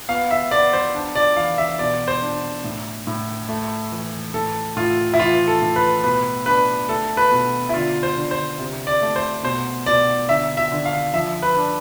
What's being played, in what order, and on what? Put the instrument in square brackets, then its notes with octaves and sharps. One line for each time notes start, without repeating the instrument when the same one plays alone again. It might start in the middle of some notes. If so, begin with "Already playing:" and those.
[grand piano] B3 F5
E5
B3 D5
C5
D4
D5
E3 F5
E5
B2 D5
C5
D4
A2
A2
A3
E3
A2 A4
A2 F4
E4
E3 F4
A4
A2
B4
B2 B4
D4 B4
A3 A4
B4
B2
E4
D3 F4
C5
D3
C5
C3
D5
A3
C5
B2 C5
B2 D5
D3 E5
E5
D3
F5
F3 E5
B4
D4